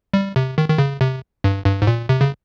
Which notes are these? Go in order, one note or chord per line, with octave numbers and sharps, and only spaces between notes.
G3
C3
D#3
D#3
C#3
C3
G2
G2
G#2
A#2
C3
C#3